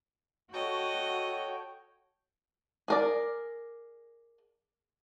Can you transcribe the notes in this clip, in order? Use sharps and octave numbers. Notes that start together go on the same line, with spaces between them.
F#4 A4 C#5 D#5 G5
G#4 A#4 D5